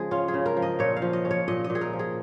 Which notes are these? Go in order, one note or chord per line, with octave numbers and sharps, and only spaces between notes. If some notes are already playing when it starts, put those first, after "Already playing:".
Already playing: C#3 F3 G#3 G#4
C#4 F4
G#4
C#3
A#4
F3
D#5
A#2 C#5
F5
F3
D#5
C#4
C#5
A#2 D#5
D#5
A#2
G#4
A#4
F3
G#4